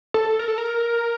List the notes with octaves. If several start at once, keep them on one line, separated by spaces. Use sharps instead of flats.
A4
A#4
A4
A#4